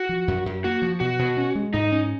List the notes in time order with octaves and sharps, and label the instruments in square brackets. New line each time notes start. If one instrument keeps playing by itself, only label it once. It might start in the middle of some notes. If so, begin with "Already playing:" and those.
Already playing: [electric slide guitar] F#4
[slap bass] F3
F#2
F#2
[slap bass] A#3 [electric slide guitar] F#4
[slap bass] F3
[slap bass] B2 [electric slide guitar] F#4
[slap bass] B2
C#4
G#3
[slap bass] G#2 [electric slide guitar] D#4
[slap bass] C#4